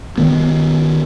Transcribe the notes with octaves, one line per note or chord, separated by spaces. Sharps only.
D#3 B3